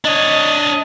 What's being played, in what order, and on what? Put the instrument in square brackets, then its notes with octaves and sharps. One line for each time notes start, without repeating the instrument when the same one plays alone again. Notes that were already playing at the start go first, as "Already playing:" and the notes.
[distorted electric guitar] D4 C#5 [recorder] D#5